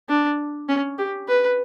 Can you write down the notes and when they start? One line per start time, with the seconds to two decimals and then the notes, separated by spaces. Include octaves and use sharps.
0.09 D4
0.69 C#4
0.98 G4
1.28 B4